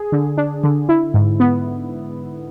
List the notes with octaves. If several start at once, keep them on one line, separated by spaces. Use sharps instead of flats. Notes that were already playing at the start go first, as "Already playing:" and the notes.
Already playing: G#4
D3
D4
D3
E4
G#2
B3